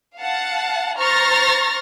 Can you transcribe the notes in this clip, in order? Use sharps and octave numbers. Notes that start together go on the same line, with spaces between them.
F5 F#5 A5
C5 A#5 C#6 F6 A6 A#6